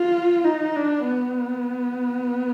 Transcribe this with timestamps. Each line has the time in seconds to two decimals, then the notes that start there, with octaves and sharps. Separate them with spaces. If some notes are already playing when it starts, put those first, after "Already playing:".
Already playing: F4
0.44 D#4
0.76 D4
1.07 B3